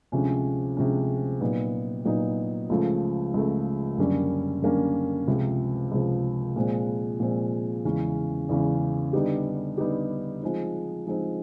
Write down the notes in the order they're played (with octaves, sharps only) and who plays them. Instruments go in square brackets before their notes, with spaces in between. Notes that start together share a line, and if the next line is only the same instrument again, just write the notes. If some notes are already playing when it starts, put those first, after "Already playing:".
[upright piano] D2 C3 F3 G#3 C#4
D2 C3 F3 G#3 C#4
A#2 F#3 B3 D#4
A#2 F#3 B3 D#4
C#2 C#3 F3 A3
C#2 C#3 F3 A3
F#2 D3 G3 A#3 C#4
F#2 D3 G3 A#3 C#4
C#2 C3 F3
C#2 C3 F3
A#2 F3 G#3 C4
A#2 F3 G#3 C4
E2 C#3 E3 G#3 C#4
E2 C#3 E3 G#3 C#4
D3 G3 B3 D#4 G4
D3 G3 B3 D#4 G4
F3 G#3 C4 D#4
F3 G#3 C4 D#4